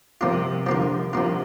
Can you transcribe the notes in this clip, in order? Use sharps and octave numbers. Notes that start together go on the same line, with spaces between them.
C3 F3 A#3 F4
D3 F3 A#3 F4
C3 F3 A#3 F4